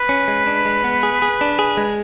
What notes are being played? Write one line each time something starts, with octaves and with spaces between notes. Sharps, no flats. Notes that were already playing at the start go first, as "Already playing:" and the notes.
Already playing: B4
C#4
G#3
D4
G#3
B3
G#4
G#4
D4
G#4
G#3